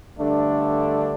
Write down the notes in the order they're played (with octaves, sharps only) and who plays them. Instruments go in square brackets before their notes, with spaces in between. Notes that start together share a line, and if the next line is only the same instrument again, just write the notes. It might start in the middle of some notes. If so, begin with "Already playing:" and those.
[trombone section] G2 D3 A3 D4